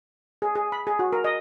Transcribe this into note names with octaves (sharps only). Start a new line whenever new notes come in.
G#4
G#4
B5
G#4
F#4
A#4
D#5